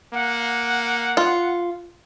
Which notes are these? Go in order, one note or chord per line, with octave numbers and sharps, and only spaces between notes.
A#3 F#5
F4